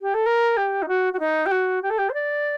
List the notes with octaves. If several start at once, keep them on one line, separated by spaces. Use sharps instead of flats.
G4
A4
A#4
G4
D#4
F#4
F#4
D#4
G4
F#4
G4
A4
G4
C5
D5